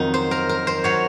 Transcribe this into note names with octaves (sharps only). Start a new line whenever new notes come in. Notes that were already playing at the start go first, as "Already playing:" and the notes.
Already playing: F2 D#3 F#3 D#4
C5
A#4
A#4
C5
F#3 C#5